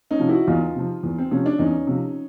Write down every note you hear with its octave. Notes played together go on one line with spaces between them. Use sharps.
C#4 D#4
C3 F3
E4 F#4
E2 D#4 F4
C3 F3
E2
C4
C3 F3 C#4
D4
E2 C#4 D#4
C3 F3